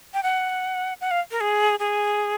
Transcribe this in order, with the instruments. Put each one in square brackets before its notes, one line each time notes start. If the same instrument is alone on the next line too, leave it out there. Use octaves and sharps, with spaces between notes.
[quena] G5
F#5
F#5
F5
A#4
G#4
G#4